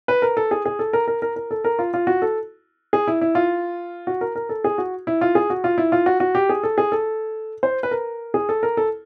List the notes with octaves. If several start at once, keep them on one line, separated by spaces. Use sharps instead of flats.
B4
A#4
A4
G#4
G#4
A4
A#4
A#4
A#4
A#4
A4
A#4
F4
F4
F#4
A4
G#4
E4
E4
F4
F#4
A#4
A#4
A4
G#4
F#4
E4
F4
G#4
F#4
F4
E4
F4
F#4
F#4
G4
G#4
A4
G#4
A4
C5
B4
A#4
G#4
A4
A#4
A4